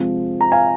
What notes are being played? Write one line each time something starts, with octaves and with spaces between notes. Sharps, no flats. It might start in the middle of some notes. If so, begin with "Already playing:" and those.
Already playing: C3 F3 G#3 C4
A#5
F5 G#5